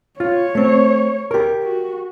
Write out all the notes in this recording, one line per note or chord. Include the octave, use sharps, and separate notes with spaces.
F4 C#5
A3 C4
G4 A#4
F#4